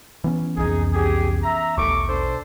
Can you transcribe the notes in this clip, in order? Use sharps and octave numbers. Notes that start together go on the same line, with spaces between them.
E3 B3 C#4
C2 F2 D#4 G#4
G4 G#4
E5 A#5
A#1 D#2 B2 A3 C#6 D6
D4 A4 C5